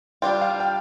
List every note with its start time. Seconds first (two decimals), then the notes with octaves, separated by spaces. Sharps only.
0.22 G3 D4 F4 G5
0.41 F5
0.60 G5